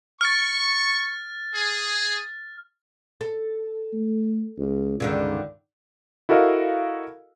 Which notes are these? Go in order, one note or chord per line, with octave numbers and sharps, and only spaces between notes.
C#6 F6 A6
G#4
A4
A3
C#2
C#2 G2 D3 D#3
E4 F#4 A4 A#4 D#5 F5